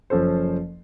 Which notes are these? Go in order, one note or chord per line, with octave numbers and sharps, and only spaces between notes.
F#1 F3 C#4 A4 C5